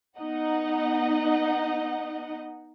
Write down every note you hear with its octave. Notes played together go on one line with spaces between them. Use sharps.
B3 D#4 D#5 F#5